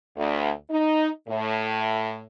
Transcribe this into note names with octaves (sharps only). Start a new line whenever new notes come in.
D2
D#4
A2